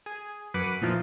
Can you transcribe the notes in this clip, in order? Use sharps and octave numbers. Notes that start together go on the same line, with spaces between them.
G#4
F#2 B4 F#5 D6 D#7
A#2 E3 F3 D#4 F4